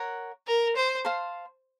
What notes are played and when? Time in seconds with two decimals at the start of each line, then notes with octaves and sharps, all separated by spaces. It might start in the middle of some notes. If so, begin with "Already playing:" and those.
Already playing: A#4 C#5 F#5
0.47 A#4
0.76 C5
1.04 C5 F5 A5 C6